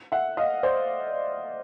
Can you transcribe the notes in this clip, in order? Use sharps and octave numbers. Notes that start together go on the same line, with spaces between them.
E5 F#5
D#5 F5
C5 D5